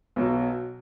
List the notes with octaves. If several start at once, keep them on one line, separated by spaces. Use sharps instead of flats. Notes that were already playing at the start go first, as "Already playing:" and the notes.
B1 B2 F#3